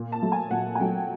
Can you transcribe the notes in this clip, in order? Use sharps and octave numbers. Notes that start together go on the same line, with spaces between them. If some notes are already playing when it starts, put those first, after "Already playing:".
Already playing: A#2
A5
F#3 A3
G#5
A#2 F#5
G#5
F#3 A3 G5